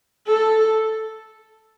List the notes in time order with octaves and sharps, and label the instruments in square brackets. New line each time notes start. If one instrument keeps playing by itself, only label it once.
[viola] A4